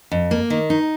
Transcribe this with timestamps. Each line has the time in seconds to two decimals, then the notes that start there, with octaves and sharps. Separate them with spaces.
0.12 F2
0.31 A#3
0.50 D#3
0.70 D#4